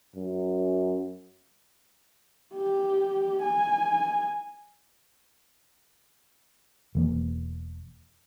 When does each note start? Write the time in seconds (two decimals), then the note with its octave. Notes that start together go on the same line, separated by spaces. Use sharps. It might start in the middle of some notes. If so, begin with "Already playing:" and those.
0.16 F#2
2.54 G4
3.42 G#5
6.95 E1 E3 A#3